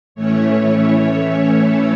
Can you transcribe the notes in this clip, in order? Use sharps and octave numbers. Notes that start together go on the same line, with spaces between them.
A2 E3 A3 C#4 E4 C#5
C#5
A4